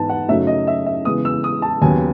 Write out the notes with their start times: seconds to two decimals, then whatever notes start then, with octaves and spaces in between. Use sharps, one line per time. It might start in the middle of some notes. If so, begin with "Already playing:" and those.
Already playing: G#2 E3 B3 D#4 A5
0.09 F#5
0.28 F#2 C#3 F#3 A3 D#4 E5
0.47 D#5
0.67 E5
0.86 E5
1.05 C#3 E3 G#3 B3 D#6
1.25 E6
1.44 D#6
1.62 A5
1.82 D#2 C#3 F#3 B3 G#5